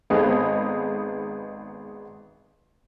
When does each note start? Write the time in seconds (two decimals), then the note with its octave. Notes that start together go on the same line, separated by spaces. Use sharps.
0.10 G#1 B3 D#4 G#4 A4 D#5